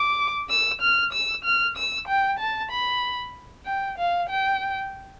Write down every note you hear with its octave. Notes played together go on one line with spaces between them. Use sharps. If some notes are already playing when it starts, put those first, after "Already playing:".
Already playing: D6
E6
F6
E6
F6
E6
G5
A5
B5
G5
F5
G5